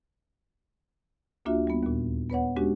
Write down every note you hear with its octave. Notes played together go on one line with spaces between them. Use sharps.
D2 A#3 D4 F4 F#4 E5
G3 B3
D#2 A#2
B3 B4 C#5 F#5
G#3 C#4 D4 F#4 G4